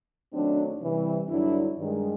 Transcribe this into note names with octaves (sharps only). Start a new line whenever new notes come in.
F#2 D#3 F#3 A3 C4 D4
C3 E3 G3
G2 D3 F#3 D4 E4
G2 D#3 G#3